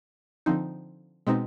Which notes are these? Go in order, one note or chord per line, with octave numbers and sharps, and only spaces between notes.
D3 F3 C4 D#4
B2 G#3 C4 D#4